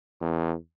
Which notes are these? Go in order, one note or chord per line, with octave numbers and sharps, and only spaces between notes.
E2